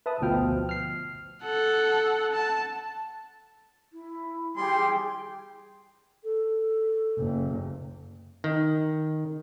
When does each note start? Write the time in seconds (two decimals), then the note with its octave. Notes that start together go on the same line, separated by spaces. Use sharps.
0.06 B4 E5 A5 B5 D#6
0.20 A1 D2 B2 F3 G5 F6
0.69 F6 C7
1.43 A4 F#5
2.33 A5
3.93 E4
4.57 G3 G4 G#4 G5 C6
6.24 A4
7.18 F#1
8.44 D#3